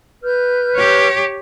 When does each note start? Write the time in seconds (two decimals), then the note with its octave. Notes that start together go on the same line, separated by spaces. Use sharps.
0.24 B4 F6 G6
0.76 G4 C#5